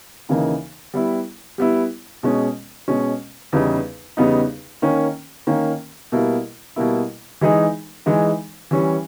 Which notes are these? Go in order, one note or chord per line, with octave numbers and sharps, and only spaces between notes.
D#2 C#3 E3 A#3 D#4
G3 B3 E4
G3 B3 E4
B2 G#3 C#4
B2 G#3 C#4
E2 C#3 G3 B3 D#4
E2 C#3 G3 B3 D#4
D#3 A#3 C#4
D#3 A#3 C#4
B2 G3 A#3 E4
B2 G3 A#3 E4
E3 G#3 D#4 G#4
E3 G#3 D#4 G#4
E3 G3 C#4